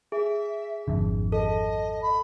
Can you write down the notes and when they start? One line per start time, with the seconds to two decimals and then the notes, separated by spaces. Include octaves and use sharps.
0.12 G#4 E5
0.88 G#1 F2 D3
1.32 A4 D#5
2.02 B5